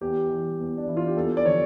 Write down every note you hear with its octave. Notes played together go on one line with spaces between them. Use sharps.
E2 G4
E3
E2
D4
E3 E4
F4
G4
E2 A4
D5
D3 F3 C#5